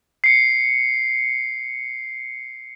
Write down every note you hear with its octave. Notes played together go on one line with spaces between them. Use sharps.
C7 C#7